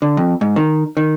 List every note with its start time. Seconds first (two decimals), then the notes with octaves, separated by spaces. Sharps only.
0.02 D3
0.17 F2
0.41 G#2
0.56 D#3
0.97 D#3